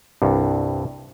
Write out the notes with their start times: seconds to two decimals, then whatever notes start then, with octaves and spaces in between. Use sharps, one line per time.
0.22 C2 G2